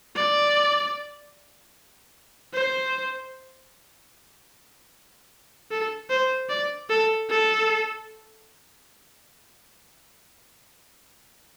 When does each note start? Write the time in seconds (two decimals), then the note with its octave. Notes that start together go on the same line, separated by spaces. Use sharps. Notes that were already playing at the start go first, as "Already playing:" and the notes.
0.15 D5
2.53 C5
5.71 A4
6.09 C5
6.49 D5
6.90 A4
7.29 A4